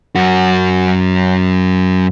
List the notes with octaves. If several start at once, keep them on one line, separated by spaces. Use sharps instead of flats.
F#2 F#4